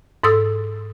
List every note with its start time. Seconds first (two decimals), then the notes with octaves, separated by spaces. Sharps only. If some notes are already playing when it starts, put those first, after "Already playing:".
0.24 G#2 A4 D#6 E6